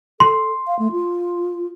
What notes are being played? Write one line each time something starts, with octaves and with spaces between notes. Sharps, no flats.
A4 C6
F5
A3
F4